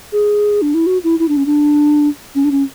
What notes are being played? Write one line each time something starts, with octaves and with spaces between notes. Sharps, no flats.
G#4
D4
E4
F#4
E4
E4
D4
C#4
D4
C#4
D4
C#4